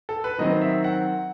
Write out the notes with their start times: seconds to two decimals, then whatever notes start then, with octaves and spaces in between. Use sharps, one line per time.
0.09 A4
0.24 B4
0.38 D#3 F#3 C4 D#5
0.61 E5
0.84 F#5